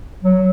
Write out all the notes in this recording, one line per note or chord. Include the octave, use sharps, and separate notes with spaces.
F#3